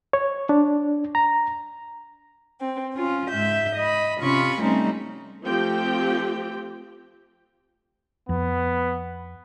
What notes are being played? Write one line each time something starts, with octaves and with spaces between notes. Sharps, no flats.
C#5
D4
A#5
C4
C#4 F4
G#2 E5 G6
D#5 B5
C3 C#4 F4 B5 C#6
G3 A3 C4 C#4 D#4
F3 A3 C4 G4 G5
F2 B3